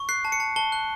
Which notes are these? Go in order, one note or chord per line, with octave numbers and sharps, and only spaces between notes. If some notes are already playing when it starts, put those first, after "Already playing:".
Already playing: C#6
F#6 C7
A5
C#7
A5
A5 G7
F#6